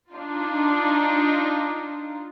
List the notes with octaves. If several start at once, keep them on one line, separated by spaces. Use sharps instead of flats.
D4 D#4 F4